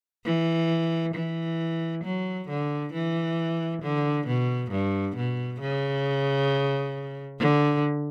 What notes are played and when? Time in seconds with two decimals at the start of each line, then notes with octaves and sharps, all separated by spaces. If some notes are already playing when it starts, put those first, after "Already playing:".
0.25 E3
1.14 E3
2.04 F#3
2.49 D3
2.93 E3
3.82 D3
4.27 B2
4.71 G2
5.17 B2
5.61 C#3
7.40 D3